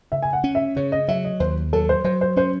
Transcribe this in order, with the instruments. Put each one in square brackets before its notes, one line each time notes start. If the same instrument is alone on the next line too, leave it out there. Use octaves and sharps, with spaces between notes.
[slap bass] C#3 [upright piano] E5
[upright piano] G#5
F#5
[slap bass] C#4
[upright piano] E5
[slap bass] C#3 [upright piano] C#5
[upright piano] D#5
[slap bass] F#3 [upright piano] E5
[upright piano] D#5
[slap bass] D#2 [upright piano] C5
[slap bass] F#3 [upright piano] A4
[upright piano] C5
[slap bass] F#3 [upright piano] C5
[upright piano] C5
[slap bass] C#4 [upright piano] C5